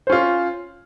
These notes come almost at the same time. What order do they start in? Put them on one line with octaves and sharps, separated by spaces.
C5 C#4 F4